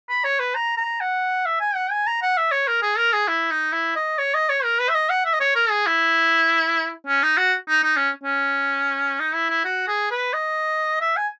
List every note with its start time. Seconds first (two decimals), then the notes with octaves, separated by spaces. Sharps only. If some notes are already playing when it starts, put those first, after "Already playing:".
0.09 B5
0.24 C#5
0.40 B4
0.55 A#5
0.77 A#5
1.01 F#5
1.46 E5
1.60 G#5
1.75 F#5
1.91 G#5
2.07 A#5
2.22 F#5
2.37 E5
2.51 C#5
2.67 A#4
2.82 G#4
2.97 A#4
3.13 G#4
3.28 E4
3.51 D#4
3.73 E4
3.96 D#5
4.18 C#5
4.34 D#5
4.49 C#5
4.64 A#4
4.79 B4
4.89 E5
4.94 D#5
5.09 F#5
5.25 E5
5.33 D#5
5.40 C#5
5.55 A#4
5.70 G#4
5.86 E4
7.07 C#4
7.23 D#4
7.38 F#4
7.68 D#4
7.83 D#4
7.97 C#4
8.23 C#4
9.20 D#4
9.34 E4
9.50 E4
9.65 F#4
9.88 G#4
10.11 B4
10.33 D#5
11.01 E5
11.17 G#5